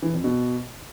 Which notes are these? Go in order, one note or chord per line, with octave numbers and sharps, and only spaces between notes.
E3
F2
B2